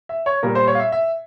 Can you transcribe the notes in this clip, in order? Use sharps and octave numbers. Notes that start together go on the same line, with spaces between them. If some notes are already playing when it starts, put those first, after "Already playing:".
E5
C#5
A#2 G3 A#4
C5
C#5
F5
E5
E5